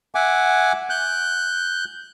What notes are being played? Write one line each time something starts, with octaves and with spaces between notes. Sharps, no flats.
E5 F#5 G#5 D6
F#6 G6